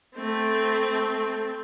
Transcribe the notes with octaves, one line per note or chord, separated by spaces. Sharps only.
A3 C4